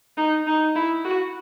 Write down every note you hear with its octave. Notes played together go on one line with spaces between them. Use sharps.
D#4
D#4
E4
F#4